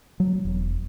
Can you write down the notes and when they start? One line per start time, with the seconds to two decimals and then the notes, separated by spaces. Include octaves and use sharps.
0.20 F#3
0.45 E1